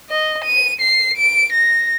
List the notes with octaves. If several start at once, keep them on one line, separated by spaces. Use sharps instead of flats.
D#5
D#7
C7
D7
A#6